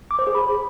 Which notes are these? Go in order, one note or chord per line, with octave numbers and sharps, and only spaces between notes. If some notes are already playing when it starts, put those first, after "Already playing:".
D6
C5
G#4
B5